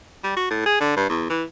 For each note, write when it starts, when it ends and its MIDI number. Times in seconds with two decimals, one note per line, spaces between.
0.24 0.36 55
0.37 0.50 66
0.51 0.64 45
0.66 0.77 68
0.81 0.95 50
0.97 1.08 43
1.09 1.26 40
1.30 1.44 52